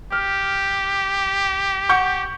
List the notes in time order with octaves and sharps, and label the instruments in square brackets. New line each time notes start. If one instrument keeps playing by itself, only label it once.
[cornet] G4 [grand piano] F6
[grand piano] F#5 C#6 G6